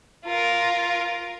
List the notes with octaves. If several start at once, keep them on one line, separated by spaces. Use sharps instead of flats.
F4 A#4